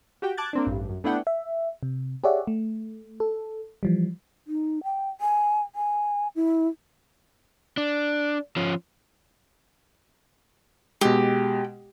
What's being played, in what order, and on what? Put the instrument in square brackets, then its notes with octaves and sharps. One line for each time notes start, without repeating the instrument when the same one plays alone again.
[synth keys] F#4 G4 G5
A5 D6 F#6 G#6 A6
A#3 C4 D4
A1 G2
F#2
A3 B3 D4 E4 F#5 G5
[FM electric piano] E5
C3
G4 G#4 C#5 D5 E5 F#5
A3
A4
E3 F3 G3
[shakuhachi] D#4
G5
G#5
G#5
E4
[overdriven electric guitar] D4
F3 C#4
[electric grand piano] B2 G#3 [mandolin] G4